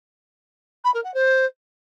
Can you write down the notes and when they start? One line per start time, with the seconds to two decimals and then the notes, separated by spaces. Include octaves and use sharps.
0.84 B5
0.94 A#4
1.04 F#5
1.14 C5